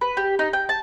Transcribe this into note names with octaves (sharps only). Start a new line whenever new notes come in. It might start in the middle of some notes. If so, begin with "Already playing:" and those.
B4
G4
D#4
G5
A5